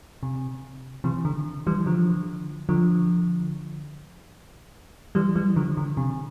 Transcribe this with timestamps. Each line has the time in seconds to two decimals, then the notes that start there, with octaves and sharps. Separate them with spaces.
0.23 C3
1.04 C3 E3
1.25 D3
1.67 E3 G3
1.86 D3 F3
2.69 D3 F3
5.15 E3 G3
5.36 E3 G3
5.56 D3 F3
5.77 D3
5.97 C3